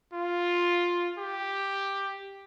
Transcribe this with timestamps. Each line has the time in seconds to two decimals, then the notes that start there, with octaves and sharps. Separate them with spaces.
0.13 F4
1.18 G4